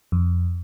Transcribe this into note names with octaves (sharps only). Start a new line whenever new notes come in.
F2